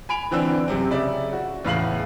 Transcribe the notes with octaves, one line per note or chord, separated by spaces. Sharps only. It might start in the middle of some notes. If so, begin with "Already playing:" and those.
G#5 B5 D7 F7
D3 E3 C4 D4 E6
F#2 C3 C4
C#3 D5 E5
F#4
E2 A2 C#3 F5 C7 F#7